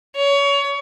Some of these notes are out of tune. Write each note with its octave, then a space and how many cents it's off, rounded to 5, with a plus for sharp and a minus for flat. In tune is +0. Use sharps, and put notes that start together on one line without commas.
C#5 +25